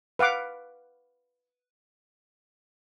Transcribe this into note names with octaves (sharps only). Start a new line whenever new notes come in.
B4 F5 F#5 D6